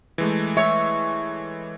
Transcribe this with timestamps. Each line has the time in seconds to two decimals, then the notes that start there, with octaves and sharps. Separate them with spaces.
0.18 E3 G#3 A3
0.57 C#5 E5